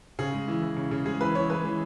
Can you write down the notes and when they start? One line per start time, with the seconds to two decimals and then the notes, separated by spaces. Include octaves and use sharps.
0.19 C#3 G#4
0.34 G#3
0.48 E3
0.62 E3
0.76 C#3
0.91 C#3
1.06 G#3 G#4
1.21 E3 B4
1.35 E3 C#5
1.50 G#3 B4
1.64 E3